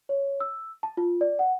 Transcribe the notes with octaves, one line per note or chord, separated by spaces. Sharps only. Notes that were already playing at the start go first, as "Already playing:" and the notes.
C#5
E6
A5
F4
D5
F#5